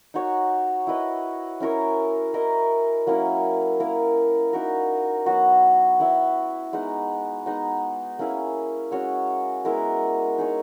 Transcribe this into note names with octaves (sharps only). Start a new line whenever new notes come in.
D#4 F#4 C#5
E4 B4 D#5
C#4 E4 A#4 C#5
E4 A#4 D#5
F#3 A#3 C#4 E4
A#3 E4 A#4
D#4 F#4 A#4
F#3 B3 F#4
B3 E4 B4 E5
G#3 B3 D#4
G#3 B3 D#4
A#3 C#4 E4 G#4
G#3 C#4 F#4 C#5
G#3 B3 E4 A#4
D#4 G#4 C#5